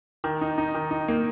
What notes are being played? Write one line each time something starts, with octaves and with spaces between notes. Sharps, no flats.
D#3
D#4
D#4
D#3
D#4
A#3